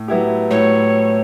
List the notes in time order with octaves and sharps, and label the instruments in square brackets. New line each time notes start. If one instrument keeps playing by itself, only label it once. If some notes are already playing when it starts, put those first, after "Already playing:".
Already playing: [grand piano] A2
F#3 B3 E4 G4
[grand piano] A2 [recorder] C#5